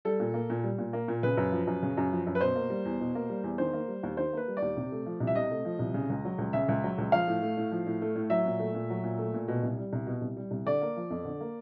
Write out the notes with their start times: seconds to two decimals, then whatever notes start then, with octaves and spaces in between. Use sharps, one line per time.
0.05 G3 A4
0.20 A#2
0.34 A#3
0.50 A#2
0.63 G3
0.78 A#2
0.93 A#3
1.08 A#2
1.23 C#3 B4
1.37 F#2
1.52 F3
1.67 F#2
1.83 C#3
1.97 F#2
2.12 F3
2.27 F#2
2.35 B4
2.41 B2 C5
2.56 A#3
2.70 G3
2.85 E2
3.00 B2
3.15 A#3
3.29 G3
3.44 E2
3.58 D#3 C5
3.73 A#3
3.88 G3
4.03 D#2
4.17 D#3 C5
4.33 A#3 B4
4.48 G3
4.57 D5
4.62 D#2
4.77 C3
4.92 A3
5.06 F3
5.20 C2
5.27 E5
5.35 C3 D#5
5.51 A3
5.65 F3
5.79 C2
5.94 C#3
6.10 C#2
6.25 F#3
6.38 C#2
6.53 C#3 E5
6.68 C#2
6.83 F#3
6.98 C#2
7.12 F3 F5
7.27 A2
7.42 A3
7.57 A2
7.71 F3
7.86 A2
8.02 A3
8.15 A2
8.30 F#3 E5
8.46 A#2
8.60 A3
8.74 A#2
8.90 F#3
9.04 A#2
9.19 A3
9.34 A#2
9.48 B2
9.63 C2
9.78 G3
9.93 C2
10.07 B2
10.21 C2
10.37 G3
10.51 C2
10.66 D3 D5
10.82 A#3
10.96 F3
11.11 F2
11.25 D3
11.41 A#3